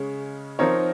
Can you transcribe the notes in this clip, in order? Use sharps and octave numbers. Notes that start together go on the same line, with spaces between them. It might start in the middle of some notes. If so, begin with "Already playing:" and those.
Already playing: C#3 G#3 C#4
F3 C4 D#4 A#4 C#5